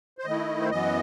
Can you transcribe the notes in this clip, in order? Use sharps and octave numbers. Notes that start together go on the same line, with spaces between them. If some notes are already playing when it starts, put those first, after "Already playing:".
C5
D#3 A3 E4 D#5
C5
F#2 E3 B3 D#5